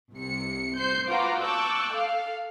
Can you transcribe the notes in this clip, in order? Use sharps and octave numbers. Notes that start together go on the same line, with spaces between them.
C2 C3 C#7
C5 G6 C7
F4 F#4 B4 F#5 A#5 D6
A5 C#6 D6 E6 F#6 G6
A4 F5